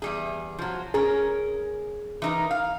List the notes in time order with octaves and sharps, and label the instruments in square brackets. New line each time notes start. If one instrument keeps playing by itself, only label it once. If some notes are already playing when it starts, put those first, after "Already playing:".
[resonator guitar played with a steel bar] E2 G3 G#4
F3 F#3
[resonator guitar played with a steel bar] C#4 A#4 [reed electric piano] G#4
[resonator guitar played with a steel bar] E3 D#4 A#4
F5